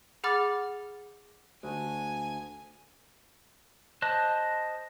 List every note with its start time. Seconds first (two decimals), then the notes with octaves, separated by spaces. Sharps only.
0.24 G#4 F#5 B5 D6 F6 A6
1.63 D2 G#5
4.02 C5 D#5 A5 F#6